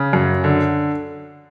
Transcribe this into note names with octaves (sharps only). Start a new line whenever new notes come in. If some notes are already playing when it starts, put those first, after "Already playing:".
Already playing: C#3
F#2
D3